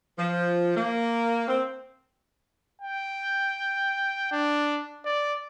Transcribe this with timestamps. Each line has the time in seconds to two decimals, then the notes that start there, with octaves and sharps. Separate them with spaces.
0.19 F3
0.77 A#3
1.48 C4
2.81 G5
4.32 D4
5.05 D5